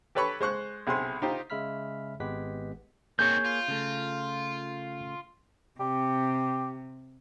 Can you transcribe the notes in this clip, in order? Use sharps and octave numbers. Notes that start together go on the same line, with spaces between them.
G4 A4 B4 C#5 B5 C#6
G#3 C5 C#6 F#6
B1 C3 G#4 C5 C6
D#4 F4 G4 C5
C#3 G#3 E5 B5 F6 B6
G#1 G#3 B3 G4 B4 B6
D#3 A#3 C4 G#4 C#5 G6
F4
C#3 A3
C3 G4